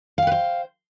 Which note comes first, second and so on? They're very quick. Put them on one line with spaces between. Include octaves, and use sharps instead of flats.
F5 G5 B4 C5